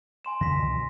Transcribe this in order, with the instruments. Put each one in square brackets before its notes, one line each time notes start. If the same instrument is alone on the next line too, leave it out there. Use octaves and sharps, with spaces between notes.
[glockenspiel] G#5 C6 E7
[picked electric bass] F#2 D3 E3 [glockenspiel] A#6 B6
[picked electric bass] C#2 B2